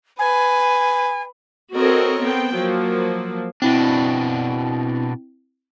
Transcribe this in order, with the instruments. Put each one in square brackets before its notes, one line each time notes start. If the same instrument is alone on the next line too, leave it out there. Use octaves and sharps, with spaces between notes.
[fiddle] B4 [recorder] G#5
[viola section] C4 F#4 A4 A#4 C#5 D#5
B3 C4 G5
F3 F#3 A#3
[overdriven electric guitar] B2 D4 [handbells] C4 E4